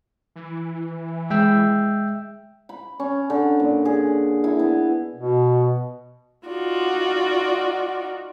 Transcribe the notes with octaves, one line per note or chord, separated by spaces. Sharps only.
E3
G#3 E5 G5 E6
B5
C#4
D3
A#2
G#4
E4
B3
B2
D#4 F4 F#4 D5